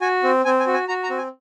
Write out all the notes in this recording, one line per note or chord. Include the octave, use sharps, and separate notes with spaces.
F#4 G#5
C4
C4 G#5
G#5
F#4
G#5
F#4 A#5
A#5
C4
G#5